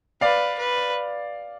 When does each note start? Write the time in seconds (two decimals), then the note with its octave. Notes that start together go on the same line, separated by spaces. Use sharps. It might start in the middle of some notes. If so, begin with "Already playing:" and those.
0.21 B4 D5 F5
0.58 B4